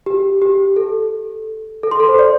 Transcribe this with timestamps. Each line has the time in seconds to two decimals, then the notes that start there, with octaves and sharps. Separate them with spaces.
0.06 G4
0.42 G4
0.76 A4
1.83 A4
1.91 C6
2.00 A4
2.09 C5
2.19 D5